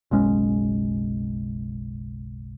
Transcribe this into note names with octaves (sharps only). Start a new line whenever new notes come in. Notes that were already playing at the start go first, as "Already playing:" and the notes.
F#1 B1 G#3 C#4